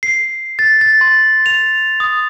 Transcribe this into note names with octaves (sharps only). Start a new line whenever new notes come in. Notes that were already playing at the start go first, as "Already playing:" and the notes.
C7
A6
A6
C6
F7
D#6